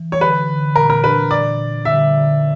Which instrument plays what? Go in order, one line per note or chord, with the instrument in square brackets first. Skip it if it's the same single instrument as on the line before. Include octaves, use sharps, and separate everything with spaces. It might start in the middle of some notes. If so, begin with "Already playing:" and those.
Already playing: [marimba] E3
[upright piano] C#5
[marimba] D3 [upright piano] B4
[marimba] D3
[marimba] A#2 [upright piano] A#4
[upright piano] A#4
[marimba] D4 [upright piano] B4
[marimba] A#2 [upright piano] D5
[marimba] A#2
[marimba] D3 [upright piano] E5
[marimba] D3